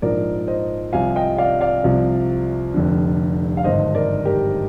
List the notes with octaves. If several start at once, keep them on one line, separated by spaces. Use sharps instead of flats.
A#1 G#2 F3 A#4 D5
C5 D#5
C2 C3 F3 F5 G#5
D#5 G5
D5 F5
D5 F5
C2 C3 F3
F1 F2 D3
F5
G#1 G2 D3 C5 D#5
A#4 D5
G4 A#4